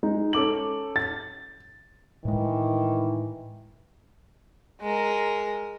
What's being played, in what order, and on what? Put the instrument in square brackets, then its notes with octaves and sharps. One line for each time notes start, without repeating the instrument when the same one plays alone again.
[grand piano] G#3 D#4
C#4 A4 D6 F#7
A6
[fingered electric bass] A2 G#3 [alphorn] D#3 [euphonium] E3
[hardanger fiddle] G#3 A#4